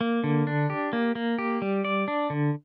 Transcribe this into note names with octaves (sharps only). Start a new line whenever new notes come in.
A#3
D3
D4
G4
A#3
A#3
G4
G3
D5
D4
D3